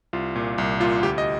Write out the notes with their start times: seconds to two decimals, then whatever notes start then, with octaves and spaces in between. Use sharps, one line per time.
0.13 C2 F4
0.36 A#2
0.58 C2
0.80 A#2 F4
1.02 D2 G4
1.18 D#5